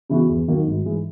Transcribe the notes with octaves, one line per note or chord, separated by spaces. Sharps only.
C#3 E3 B3 F#4
E2
D#3 F#3 A#3
G#1
G#2 E3 G#3